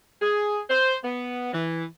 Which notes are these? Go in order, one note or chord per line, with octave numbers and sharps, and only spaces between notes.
G#4
C5
B3
E3